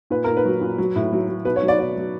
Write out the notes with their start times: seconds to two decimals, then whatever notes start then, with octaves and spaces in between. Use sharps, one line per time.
0.10 A#2 B4
0.24 A#2 A#4
0.37 B4
0.45 F#3
0.61 A#2
0.78 F#3
0.96 A2
1.12 F#3
1.28 F#3
1.45 B2 B4
1.56 C#5
1.63 F#3
1.68 D5
1.79 B2 D5
1.96 F#3